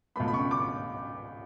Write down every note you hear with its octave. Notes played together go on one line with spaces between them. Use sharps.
C#2 B2 A3 B5
B5
C#6
D6